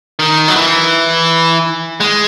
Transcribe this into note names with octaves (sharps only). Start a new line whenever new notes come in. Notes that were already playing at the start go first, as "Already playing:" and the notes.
D#3
F#3
E3
G#3